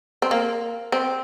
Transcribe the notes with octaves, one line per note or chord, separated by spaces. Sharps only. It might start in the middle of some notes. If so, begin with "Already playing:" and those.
C4
A#3
C4